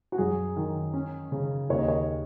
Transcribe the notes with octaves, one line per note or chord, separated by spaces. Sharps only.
F#4
F#2 G#4
D#3
C#4
C#3
D#2 C#5
D#5
C#5